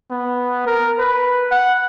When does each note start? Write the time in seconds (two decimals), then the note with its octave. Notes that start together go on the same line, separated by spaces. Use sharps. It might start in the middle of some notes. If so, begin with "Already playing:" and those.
0.11 B3
0.67 A#4
0.99 B4
1.51 F#5